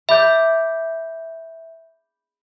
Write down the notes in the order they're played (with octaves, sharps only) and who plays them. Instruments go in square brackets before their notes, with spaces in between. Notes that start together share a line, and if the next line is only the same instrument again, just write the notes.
[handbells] E5 [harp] B5 D6 G6